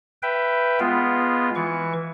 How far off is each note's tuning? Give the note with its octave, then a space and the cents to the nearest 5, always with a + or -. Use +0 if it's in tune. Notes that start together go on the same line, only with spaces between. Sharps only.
B4 +0 E5 +20 G5 +0
G#3 +0 B3 +0 F4 +0
E3 +0 C#6 +20